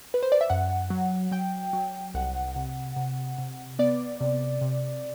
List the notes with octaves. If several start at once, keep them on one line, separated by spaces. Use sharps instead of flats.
B4
C5
D5
E5
F#2 F#5
F#3
F#3 G5
F#3
C2 F#5
C3
C3
C3
B3 D5
C3
C3